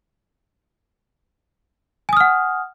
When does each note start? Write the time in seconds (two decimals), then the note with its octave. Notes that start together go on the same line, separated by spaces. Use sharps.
2.09 G#5
2.13 D#6
2.17 F6
2.20 F#5